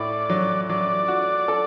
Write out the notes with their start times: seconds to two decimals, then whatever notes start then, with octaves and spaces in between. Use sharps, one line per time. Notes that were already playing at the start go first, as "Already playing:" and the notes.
Already playing: A2 D5
0.30 F#3
0.69 F#3 D5
1.08 F#4
1.48 A4